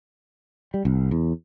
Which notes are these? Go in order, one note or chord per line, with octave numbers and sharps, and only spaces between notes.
G3
C2
E2